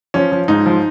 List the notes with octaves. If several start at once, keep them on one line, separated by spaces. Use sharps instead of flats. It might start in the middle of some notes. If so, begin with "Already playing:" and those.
F3 C#4
F3
G#2 D#4
F3